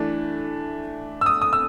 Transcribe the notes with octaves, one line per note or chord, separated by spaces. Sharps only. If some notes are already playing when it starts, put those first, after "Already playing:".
Already playing: E3 A3 D4
E6
D#6
D#6
E6